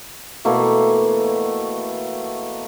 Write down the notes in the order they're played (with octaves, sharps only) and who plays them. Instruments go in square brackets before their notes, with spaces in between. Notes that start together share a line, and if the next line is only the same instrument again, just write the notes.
[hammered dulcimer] B2 E3 A3 A#3